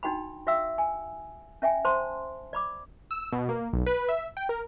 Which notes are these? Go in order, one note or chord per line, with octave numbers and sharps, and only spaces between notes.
D4 D#4 F#4 G5 B5
F#4 E5 F5 G5 E6
G#5
C#4 E5 G5 G#5
C5 A5 C6
D5 B5 D6
E6
B2
A#3
B1
B4
E5
G5
A#4